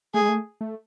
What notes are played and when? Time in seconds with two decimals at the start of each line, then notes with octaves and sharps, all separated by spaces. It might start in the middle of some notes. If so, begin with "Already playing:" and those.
0.14 A3 G#4
0.21 G#3
0.29 A3
0.61 A3